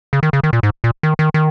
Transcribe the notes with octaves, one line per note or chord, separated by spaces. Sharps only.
C#3
D#3
C#3
D#3
A#2
G#2
A#2
D#3
D#3
D#3